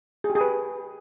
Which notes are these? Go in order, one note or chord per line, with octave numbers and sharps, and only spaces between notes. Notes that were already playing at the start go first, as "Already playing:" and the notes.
G#4
G4
G#4
B4